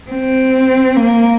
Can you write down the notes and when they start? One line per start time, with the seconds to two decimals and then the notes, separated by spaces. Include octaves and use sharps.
0.11 C4
0.97 A#3